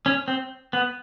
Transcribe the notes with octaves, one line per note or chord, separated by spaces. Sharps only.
C#4
C4
B3